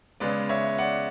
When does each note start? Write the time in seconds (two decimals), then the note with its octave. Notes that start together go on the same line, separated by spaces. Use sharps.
0.20 C#3 G#3 B3 B4 D5
0.49 C#5 E5
0.78 D5 F#5